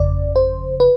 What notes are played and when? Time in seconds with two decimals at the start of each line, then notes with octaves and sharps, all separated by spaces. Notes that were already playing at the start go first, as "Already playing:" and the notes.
Already playing: G1 F2 C#3 D5
0.36 C5
0.80 B4